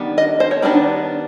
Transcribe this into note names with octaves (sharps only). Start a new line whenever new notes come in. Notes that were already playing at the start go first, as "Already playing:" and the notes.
Already playing: D#3 G3 B3 D4
D#5
C5
C#5
D#3 G3 B3 D4 D5